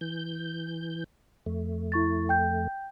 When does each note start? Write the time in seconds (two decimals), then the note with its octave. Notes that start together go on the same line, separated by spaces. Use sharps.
0.01 E3 G6
1.46 F2 A3
1.92 E4 C#6 A6
2.29 G5 G6